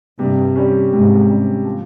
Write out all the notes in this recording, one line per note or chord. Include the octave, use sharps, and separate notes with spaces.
G2 C3
G3 C#4
G#2 C3
G3 C#4
F3